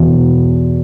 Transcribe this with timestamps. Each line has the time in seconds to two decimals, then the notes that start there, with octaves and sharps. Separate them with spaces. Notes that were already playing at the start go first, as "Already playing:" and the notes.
Already playing: E2 B2